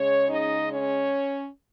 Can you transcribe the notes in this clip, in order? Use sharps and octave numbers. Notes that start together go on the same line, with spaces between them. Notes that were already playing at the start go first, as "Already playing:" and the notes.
Already playing: C#3 G#3 C#4 C#5
D#4 D#5
C#4 C#5